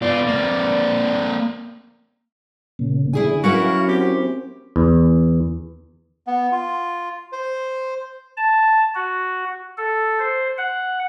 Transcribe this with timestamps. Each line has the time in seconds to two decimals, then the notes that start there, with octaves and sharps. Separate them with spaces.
0.02 B3 F4 D5
0.27 A#3 C4
2.79 A#2 C#3
3.13 D3 E4 G#4 G#5
3.44 F#3 C#4 E4 F#4 A#4 F5
3.88 C4 G4
4.76 E2
6.27 B3
6.52 F4
7.32 C5
8.37 A5
8.95 F#4
9.77 A4
10.19 C5
10.57 F#5